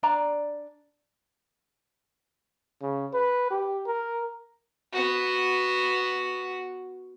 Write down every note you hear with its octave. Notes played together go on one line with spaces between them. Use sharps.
D4 D5 A#5
C#3
B4
G4
A#4
B3 F#4